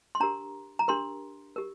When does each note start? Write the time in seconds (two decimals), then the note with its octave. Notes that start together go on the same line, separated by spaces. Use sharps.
0.15 C6
0.20 D4 G4 A#4 A#5
0.79 A#5
0.88 D4 G4 A#4 C6
1.56 G4 A#4